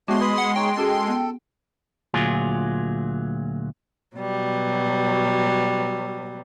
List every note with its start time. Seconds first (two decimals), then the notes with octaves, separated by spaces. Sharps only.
0.08 G#3 A3 B3 D4 F#4 C#5 C6
0.21 B4 B5 D#6
0.38 F#5
0.56 D#4 C#5 G5
0.77 C#4 F#4 G#4 A4
1.08 B3
2.14 D2 A#2 F#3 F4 G#4
4.16 B2 F#3 G3